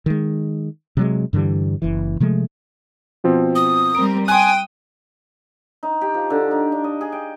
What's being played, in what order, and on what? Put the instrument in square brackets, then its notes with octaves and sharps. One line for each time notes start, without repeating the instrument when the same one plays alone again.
[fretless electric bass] D#3 G#3
C3 F#3 G#3
G2 D3 E3 G3
F#1 E3
C3 F3 G#3 A3
[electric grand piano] B2 F3 C4
[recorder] D#6
[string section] G3 C4 A#4 [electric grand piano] D7
[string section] G5 D#6 [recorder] G#5 [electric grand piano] C6 F#6
[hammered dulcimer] D#4
G4
F3
D3
D#4
D4
D#5
G#4
G5